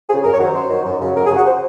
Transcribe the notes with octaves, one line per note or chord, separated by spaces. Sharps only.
C#3 F3 G#4
F#2 A#4
C#5
D#3 F#3 C5
F#2 C5
D#3 F#3
F#2
C#3 F#3
F#2 A#4
G#4
C#3 F#3 F#4
C5